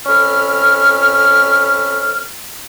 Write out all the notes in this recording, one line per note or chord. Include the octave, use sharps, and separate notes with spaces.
F2 C#4 A4 B5 F6